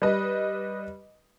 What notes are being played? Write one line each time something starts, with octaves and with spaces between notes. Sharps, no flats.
G3 B4 D#5